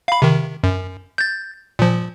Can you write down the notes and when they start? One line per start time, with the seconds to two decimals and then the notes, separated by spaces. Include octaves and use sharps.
0.08 F5 B5
0.22 C3 D#3
0.64 F#2
1.18 G6 A6
1.79 A#2 F3